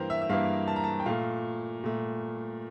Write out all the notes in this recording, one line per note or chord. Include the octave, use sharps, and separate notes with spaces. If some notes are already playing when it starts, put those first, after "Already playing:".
Already playing: G2 E3 A#3 G4 A#4 C5
E5
E5
G2 E3 A#3 F5
A5
A#5
A5
G5
A#2 A3 F5
A#2 A3